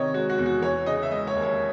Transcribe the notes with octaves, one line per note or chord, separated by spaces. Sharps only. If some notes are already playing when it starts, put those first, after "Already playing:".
Already playing: C3 D#3 C#5 D#5
G#3 F#4
F#4
E2
F#4
E3 C#5
C#3 D#5
E5
G#3 D#5
C#5
D#2
C#5